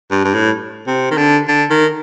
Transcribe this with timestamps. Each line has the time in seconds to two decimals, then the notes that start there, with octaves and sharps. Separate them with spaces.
0.11 G2
0.25 G2
0.34 A2
0.87 C3
1.11 D#3
1.17 D3
1.48 D3
1.70 D#3